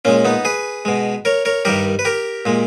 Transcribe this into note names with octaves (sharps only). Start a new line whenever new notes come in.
A#2 G#3 C#4
B3 D#4
G#4 B4
B2 G#3
A#4 C#5
A#4 C#5
G2 D#3 G3 G4 A#4
B4
G4 A#4
A#2 G#3